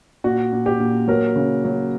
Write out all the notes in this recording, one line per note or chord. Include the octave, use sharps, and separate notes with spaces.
A#2 F#4
A#2
G4
A#2
F#3 A#4
C#3
F#3